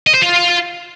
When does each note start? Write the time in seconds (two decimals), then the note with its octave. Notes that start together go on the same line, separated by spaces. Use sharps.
0.07 D#5
0.14 C5
0.22 F4